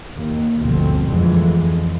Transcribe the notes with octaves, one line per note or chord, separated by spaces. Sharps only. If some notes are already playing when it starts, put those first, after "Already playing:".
D#2
G1 D2 B2 F3 C4
F2 D3 E3 F3 G#3